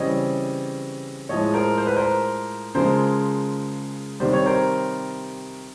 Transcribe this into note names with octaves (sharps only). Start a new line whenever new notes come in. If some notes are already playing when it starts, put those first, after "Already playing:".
Already playing: C#3 E3 G3 C4 C#5 D#5
A2 F3 G#3 C#5 D#5
A#4 C5
C5
B4
A#4 C5
C#3 F3 G#3 A#4 C5
C3 D#3 G3 C5
C#5
A#4 C5